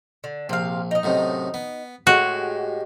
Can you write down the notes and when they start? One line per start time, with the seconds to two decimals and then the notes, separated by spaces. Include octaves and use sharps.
0.24 D3
0.49 A#1 C3 F5
0.91 D#4 D#5
1.03 F#2 A2 C3
1.54 B3
2.07 A2 G#3 F#4 G4